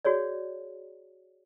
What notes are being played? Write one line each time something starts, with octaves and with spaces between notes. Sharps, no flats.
F#4 G#4 C#5 D5